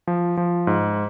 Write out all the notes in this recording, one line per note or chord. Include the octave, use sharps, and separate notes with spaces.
F3
F3
G#2